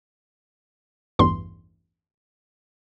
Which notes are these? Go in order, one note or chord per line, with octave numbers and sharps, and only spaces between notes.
A1 E2 G2 C6